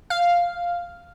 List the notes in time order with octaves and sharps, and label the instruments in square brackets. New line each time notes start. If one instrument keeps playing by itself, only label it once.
[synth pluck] F5